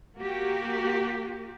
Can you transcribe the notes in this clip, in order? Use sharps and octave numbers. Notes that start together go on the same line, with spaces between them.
A#3 F#4 G4